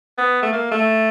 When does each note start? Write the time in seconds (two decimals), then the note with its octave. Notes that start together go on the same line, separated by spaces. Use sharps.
0.18 B3
0.43 A3
0.53 A#3
0.72 A3